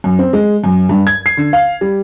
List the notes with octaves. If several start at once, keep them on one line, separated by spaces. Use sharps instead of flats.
F#2
C4
G#3
F#2
G2
G#6
C7
D3
F5
G3